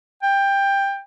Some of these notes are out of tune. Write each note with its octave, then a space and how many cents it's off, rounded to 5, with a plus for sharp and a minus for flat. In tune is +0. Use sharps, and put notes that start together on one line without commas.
G5 +15